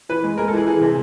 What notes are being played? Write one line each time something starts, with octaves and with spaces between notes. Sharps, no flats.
E3 B4
G#3
G#3 A#4
A4
E3 G#4
E3 G#4
C3